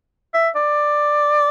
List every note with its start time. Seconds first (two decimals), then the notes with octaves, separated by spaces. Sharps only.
0.34 E5
0.55 D5